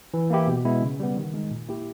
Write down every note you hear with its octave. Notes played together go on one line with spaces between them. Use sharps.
E3
A#3 E4 G4
B2
G#3 B3 E4
C#3
G3 B3
D#3
G#3 D#4
A#2
A#3 E4 G4